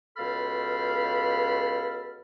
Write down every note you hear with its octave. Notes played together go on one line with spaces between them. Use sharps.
C#2 B2 A4 F5 B5 F6